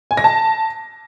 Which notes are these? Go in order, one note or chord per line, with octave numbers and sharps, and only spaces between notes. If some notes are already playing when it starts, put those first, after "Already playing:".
G#5
A#6
A5